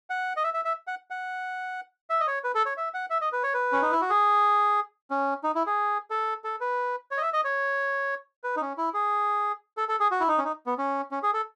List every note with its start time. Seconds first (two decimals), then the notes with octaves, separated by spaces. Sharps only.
0.10 F#5
0.37 D#5
0.44 E5
0.54 E5
0.65 E5
0.87 F#5
1.10 F#5
2.10 E5
2.20 D#5
2.27 C#5
2.44 B4
2.55 A4
2.66 C#5
2.77 E5
2.94 F#5
3.10 E5
3.21 D#5
3.32 B4
3.43 C#5
3.54 B4
3.72 C#4
3.82 D#4
3.92 E4
4.01 F#4
4.10 G#4
5.11 C#4
5.44 D#4
5.55 E4
5.67 G#4
6.10 A4
6.44 A4
6.61 B4
7.11 C#5
7.17 D#5
7.22 E5
7.33 D#5
7.44 C#5
8.44 B4
8.56 D#4
8.61 C#4
8.78 E4
8.94 G#4
9.77 A4
9.88 A4
10.00 G#4
10.11 F#4
10.20 E4
10.28 D#4
10.38 C#4
10.44 D#4
10.66 B3
10.78 C#4
11.11 C#4
11.23 G#4
11.34 A4